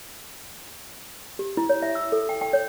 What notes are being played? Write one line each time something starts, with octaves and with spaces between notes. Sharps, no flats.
G4
E4
C#5
E5
E6
A4
G5
G5
C#5